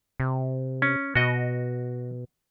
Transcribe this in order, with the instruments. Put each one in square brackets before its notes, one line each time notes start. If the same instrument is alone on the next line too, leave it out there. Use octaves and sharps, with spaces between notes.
[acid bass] C3
[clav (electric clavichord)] C#4
[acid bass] B2 [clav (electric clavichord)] F#4 D#5